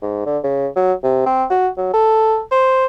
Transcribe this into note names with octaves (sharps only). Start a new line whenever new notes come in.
G#2
D3
C#3
F#3
C3
C4
F#4
F#3
A4
C5